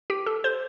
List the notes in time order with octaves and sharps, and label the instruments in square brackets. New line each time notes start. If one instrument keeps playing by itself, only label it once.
[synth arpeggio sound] G4
A4
C5